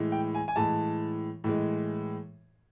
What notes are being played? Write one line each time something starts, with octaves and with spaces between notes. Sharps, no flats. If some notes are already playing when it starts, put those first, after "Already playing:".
Already playing: A2 E3 G#3
G5
G#5
G#5
A2 E3 G#3 A5
A2 E3 G#3